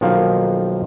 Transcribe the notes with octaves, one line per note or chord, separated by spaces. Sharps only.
B1 D#3 F3 A#3 F5